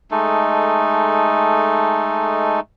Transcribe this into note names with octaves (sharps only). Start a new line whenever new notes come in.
G#3 A3 D#4 A4